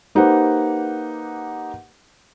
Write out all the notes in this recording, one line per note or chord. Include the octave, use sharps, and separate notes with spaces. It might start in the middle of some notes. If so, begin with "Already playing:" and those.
A#3 D#4 G4 B4 C5 F#5